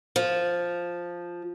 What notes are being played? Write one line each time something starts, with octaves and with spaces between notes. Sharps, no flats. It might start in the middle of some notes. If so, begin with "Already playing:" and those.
F3